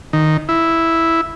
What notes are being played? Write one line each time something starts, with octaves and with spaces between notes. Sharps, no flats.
D#3
E4